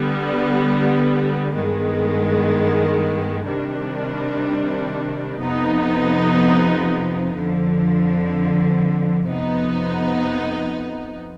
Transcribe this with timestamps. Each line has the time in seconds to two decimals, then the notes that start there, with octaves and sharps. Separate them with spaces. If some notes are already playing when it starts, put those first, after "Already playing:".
Already playing: D3 G3 B3
1.53 G2 D#3 G#3 B3
3.46 C3 D#3 G3 D4
5.40 F2 C3 F3 B3 D#4
7.34 F2 D3 F3
9.27 F2 C3 F3 B3 D#4